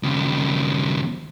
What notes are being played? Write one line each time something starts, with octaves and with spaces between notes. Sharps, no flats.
D#2 C#3